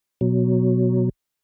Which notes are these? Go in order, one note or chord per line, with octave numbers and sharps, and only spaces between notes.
B2 F#3